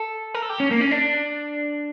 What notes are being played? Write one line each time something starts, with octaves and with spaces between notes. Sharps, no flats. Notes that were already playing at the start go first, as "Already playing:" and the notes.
Already playing: A4
A#4
A4
G4
C#4
A#3
C#4
D4